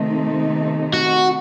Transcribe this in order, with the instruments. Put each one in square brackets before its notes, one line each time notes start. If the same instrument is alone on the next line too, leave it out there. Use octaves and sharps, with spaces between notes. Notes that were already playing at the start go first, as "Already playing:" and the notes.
Already playing: [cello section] C3 D#3 A3 C4 D#4
[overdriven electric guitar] F#4